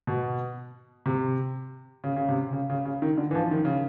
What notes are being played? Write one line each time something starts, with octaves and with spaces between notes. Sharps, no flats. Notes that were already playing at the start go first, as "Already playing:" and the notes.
B2
C3
C#3
C#3
C3
C#3
C#3
C#3
D#3
D3
E3
F3
D#3
C#3